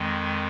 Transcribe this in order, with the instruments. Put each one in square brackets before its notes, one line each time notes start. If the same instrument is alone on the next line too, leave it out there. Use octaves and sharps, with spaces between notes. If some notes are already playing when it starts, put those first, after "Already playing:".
Already playing: [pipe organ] F2 D#3 G#3